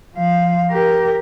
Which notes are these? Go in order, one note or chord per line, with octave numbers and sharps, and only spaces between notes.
F3 F5
G4 A#4